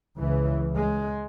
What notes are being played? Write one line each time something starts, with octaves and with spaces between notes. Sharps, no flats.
C#2 C#3 E3
G#3